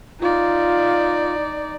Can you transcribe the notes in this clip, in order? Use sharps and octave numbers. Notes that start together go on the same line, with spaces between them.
D#4 F4 D5